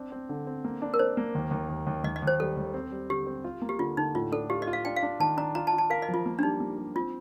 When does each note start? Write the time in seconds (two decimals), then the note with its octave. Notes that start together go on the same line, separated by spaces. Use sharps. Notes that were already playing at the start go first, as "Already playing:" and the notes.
Already playing: C4 D4
0.12 C4
0.29 D3
0.47 C4
0.64 A#3
0.82 D4
0.94 A#4
0.99 D4 C5
1.17 A#3
1.35 D#2
1.51 D#2
1.69 D#2
1.87 D#2
2.04 D#2 D#5
2.16 D#5
2.22 D#2
2.27 C5
2.40 G3 A4
2.57 D#2
2.74 C4
2.92 G3
3.09 D3 G4
3.27 C4
3.44 F4
3.62 A#3
3.69 G4
3.79 D3 F4
3.97 D3 D#4
4.15 A2 F4
4.32 D4 A4
4.50 F4 G4
4.62 D#5
4.67 F4
4.73 F5
4.85 D4 G5
4.97 F5
5.03 D4
5.20 D#3 A5
5.37 D4 A#5
5.55 F4 A#5
5.67 A5
5.73 F4
5.78 A5
5.90 A#4 F5
6.02 D#5
6.08 F3
6.14 F4
6.26 A#3
6.39 D4
6.43 G3 D#4
6.60 A#3
6.78 G3
6.95 C4 F4